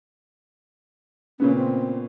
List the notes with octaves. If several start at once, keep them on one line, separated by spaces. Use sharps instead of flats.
A#2 C#3 B3 C#4
C4